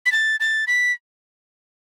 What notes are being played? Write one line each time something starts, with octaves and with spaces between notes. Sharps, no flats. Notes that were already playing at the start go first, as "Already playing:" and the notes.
B6
A6
A6
B6